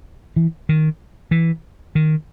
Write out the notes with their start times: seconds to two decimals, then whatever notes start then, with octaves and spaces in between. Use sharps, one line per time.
0.36 E3
0.69 D#3
1.31 E3
1.95 D#3